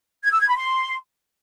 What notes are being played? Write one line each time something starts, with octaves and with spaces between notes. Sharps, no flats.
G#6
E6
G#6
B5
C6